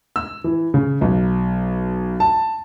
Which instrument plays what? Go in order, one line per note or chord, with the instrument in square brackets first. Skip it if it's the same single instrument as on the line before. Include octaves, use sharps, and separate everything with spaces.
[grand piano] E6
E3
C#3
B1
A5